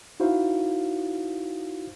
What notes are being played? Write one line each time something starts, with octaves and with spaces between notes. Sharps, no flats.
D#4 E4 F#4 C5 F5